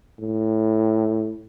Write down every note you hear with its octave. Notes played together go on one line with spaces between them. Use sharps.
A2